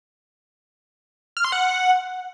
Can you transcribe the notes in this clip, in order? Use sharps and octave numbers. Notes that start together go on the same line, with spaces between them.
F6
C6
F#5